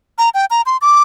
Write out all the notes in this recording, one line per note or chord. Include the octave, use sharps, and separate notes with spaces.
A#5
G5
A#5
C6
D6